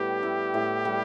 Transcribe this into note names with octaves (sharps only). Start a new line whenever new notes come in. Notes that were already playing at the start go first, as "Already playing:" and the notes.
Already playing: A2 G3 B3 G4
E4
A2
G3